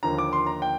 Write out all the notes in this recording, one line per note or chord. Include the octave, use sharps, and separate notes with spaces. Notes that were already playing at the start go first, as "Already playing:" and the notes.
D#2 D3 F3 A#3 A#5
D6
C6
A#5
G5